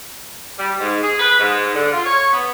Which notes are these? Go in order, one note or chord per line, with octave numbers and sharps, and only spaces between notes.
G3
G#2
G#4
B4
G#2
D3
F4
C#5
B3